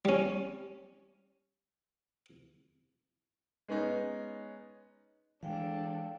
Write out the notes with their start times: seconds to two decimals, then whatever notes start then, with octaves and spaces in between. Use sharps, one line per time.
0.05 G3 C#4
3.68 G#3 B3 C#4 D#4
5.43 E3 G#3 D4 A4 F5 G5